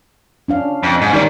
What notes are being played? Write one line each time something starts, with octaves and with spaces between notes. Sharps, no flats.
C#4 D4 F5
F2
G#2
D#3 G3 D#4 D5